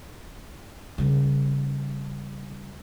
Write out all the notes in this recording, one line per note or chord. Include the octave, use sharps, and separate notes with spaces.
C#3 G3